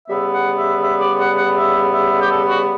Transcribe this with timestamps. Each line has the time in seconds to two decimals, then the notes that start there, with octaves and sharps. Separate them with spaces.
0.09 C#3 G3 B3 E5
0.34 F#5
0.59 E5
0.84 E5
1.01 D5
1.20 F#5
1.38 F#5
1.57 E5
1.94 E5
2.22 G4
2.30 A4
2.49 F#4